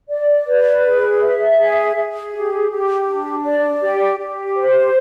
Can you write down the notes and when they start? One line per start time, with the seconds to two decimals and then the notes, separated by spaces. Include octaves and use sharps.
0.09 D5
0.47 B4
0.84 G#4
1.21 E5
1.58 G#4
1.96 G#4
2.33 G4
2.70 G4
3.07 D4
3.44 D5
3.81 G4
4.19 G4
4.56 C5